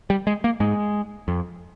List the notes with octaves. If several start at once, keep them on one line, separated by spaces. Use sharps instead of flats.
G3
G#3
A#3
G#2 G#3
F2